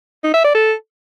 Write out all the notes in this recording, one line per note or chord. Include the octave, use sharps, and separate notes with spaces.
D#4
E5
D5
A4